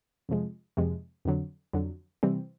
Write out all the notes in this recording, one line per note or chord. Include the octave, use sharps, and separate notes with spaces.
F2 C3 F3 G#3
F2 C3 F3 G#3
F2 D3 F#3
F2 D3 F#3
C3 E3 G3 C4